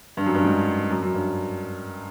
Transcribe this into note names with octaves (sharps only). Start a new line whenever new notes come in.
G2
F#2
G2
G#2
F#2
F#2
G2